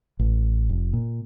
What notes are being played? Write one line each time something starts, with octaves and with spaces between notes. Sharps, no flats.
A1
F1
A#2